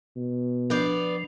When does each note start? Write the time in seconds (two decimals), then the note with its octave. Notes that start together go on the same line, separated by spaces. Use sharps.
0.16 B2
0.70 F3 B3 D4 D5 G6